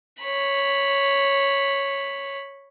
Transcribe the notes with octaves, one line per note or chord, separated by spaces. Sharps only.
C#5 B5